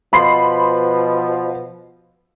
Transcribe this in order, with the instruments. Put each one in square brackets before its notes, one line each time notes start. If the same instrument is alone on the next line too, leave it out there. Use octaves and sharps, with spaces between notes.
[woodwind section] B2 F3 [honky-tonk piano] B5 C6 C7